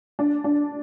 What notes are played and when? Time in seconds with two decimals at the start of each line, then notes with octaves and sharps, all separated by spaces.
0.19 D4
0.44 D4